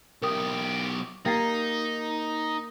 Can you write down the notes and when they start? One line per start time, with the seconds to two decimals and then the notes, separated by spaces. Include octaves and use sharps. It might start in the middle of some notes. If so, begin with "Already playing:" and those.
0.22 B1 G4 A#4 D#6
1.25 A#3 D#4 G4 G5 A6 C7